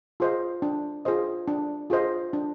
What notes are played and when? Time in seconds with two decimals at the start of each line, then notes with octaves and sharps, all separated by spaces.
0.20 F4 G#4 C5 D#5
0.62 D4
1.05 F4 G#4 C5 D#5
1.48 D4
1.90 F4 G#4 C5 D#5
2.33 D4